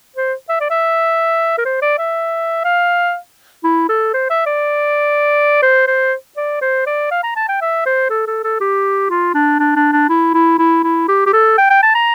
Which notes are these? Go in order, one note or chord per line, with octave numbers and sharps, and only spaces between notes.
C5
E5
D5
E5
A#4
C5
D5
E5
F5
E4
A4
C5
E5
D5
C5
C5
D5
C5
D5
F5
A#5
A5
G5
E5
C5
A4
A4
A4
G4
F4
D4
D4
D4
D4
E4
E4
E4
E4
G4
G4
A4
G5
G5
A5
A#5